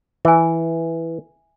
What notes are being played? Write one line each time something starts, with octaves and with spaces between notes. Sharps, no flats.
E3 E5 G#5